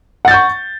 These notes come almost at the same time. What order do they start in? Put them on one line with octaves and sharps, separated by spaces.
F#5 A6 G6 C#6